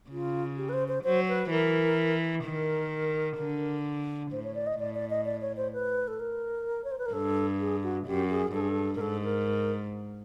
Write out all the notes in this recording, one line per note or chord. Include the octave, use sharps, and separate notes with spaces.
C#3 F4
G4
B4
C5
C5
F#3 C5
B4
E3 A#4
D#3 A#4
D3
A2 C5
C#5
D5
D#5
A2 D5
D5
D#5
D5
C#5
C5
B4
A4
A#4
C#5
C5
B4
A#4
G2 A4
G#4
F#4
F#2 G4
G#4
G2 A4
G#4
A4
A#4
G#2 A4
A#4